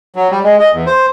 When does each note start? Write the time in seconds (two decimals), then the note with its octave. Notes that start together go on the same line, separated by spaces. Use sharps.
0.16 F#3
0.31 G3
0.44 G#3
0.60 D#5
0.73 E2
0.87 C5